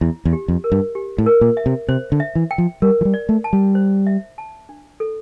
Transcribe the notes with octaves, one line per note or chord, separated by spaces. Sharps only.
E2 E4
E2
G4
F2
A#4
G2
G4
A2
A#4
A#2
E5
C3
C3 C5
D3
E5
E3
G5
F3
G3 A#4
F3
G3
D5
A3
A5
G3
C5
E5
A5
D4
A4